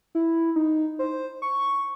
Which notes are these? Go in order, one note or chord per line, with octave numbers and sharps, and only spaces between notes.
E4
D#4
C5
C#6